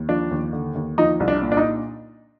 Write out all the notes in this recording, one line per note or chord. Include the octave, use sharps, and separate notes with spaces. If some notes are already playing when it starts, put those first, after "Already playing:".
Already playing: D#2
F3 D4
D#2
D3
D#2
F3 D#4
C2
D4
A#2
D4
D#4